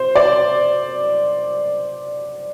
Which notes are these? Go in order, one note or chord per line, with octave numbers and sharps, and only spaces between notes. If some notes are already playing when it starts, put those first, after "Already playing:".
Already playing: C5
D5